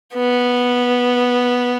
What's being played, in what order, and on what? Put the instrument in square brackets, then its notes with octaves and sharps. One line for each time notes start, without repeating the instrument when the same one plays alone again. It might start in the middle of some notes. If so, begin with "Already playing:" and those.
[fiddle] B3